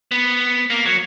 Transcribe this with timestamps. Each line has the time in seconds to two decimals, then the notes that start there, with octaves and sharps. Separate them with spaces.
0.11 B3
0.70 A#3
0.86 F#3